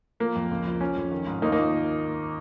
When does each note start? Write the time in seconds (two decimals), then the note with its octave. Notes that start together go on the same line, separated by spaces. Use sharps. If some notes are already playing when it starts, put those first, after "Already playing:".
0.20 F3 A#3
0.35 F2
0.51 C#2
0.66 F3
0.81 F3 C#4
0.97 F2
1.12 D#3
1.27 G#2
1.42 D#2 A#3 D#4
1.52 A#3 D#4
1.58 F3